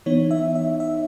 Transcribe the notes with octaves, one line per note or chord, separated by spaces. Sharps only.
E3 B3 D#4 C#5
E5
E5
E5